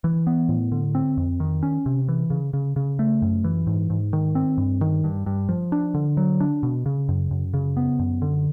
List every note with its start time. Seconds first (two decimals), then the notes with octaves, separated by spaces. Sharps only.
0.04 E3
0.27 B3
0.49 A2
0.72 D3
0.95 C4
1.17 F2
1.40 D#3
1.63 C#4
1.86 C3
2.08 E3
2.30 C#3
2.53 C#3
2.76 C#3
2.99 A3
3.22 F#2
3.44 E3
3.67 G#2
3.90 G#2
4.13 D#3
4.35 C4
4.58 G2
4.81 D#3
5.04 G2
5.26 G2
5.49 F3
5.72 D4
5.94 D3
6.17 F#3
6.40 D4
6.63 B2
6.86 C#3
7.09 F#2
7.31 F#2
7.54 C#3
7.77 B3
7.99 F#2
8.22 D3